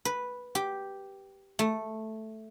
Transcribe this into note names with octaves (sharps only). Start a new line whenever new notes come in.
B4
G4
A3